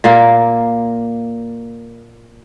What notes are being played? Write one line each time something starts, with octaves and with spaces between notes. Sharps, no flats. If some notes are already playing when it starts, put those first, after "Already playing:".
A#2 A#3 A#4